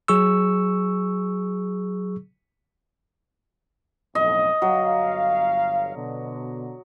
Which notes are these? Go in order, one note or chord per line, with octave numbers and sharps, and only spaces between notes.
F#3 G#4 C#6 E6
B1 F2 A2 D#5
G1 F#3 F5
B2 D3